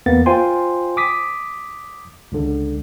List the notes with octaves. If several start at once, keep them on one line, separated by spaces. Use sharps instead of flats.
E2 A#3 B3 A6
F4 C5 G5 G#5 C6
D6 D#6 B6
C#2 D3